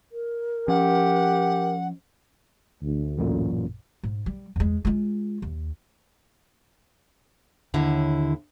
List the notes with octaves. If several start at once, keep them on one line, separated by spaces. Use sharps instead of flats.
A#4
F3 C#4 G4 F#5
D2
A1 F#2 A#2
G#2
G3
E2 G#3
G#3 F4
D#2
D#2 D3 E4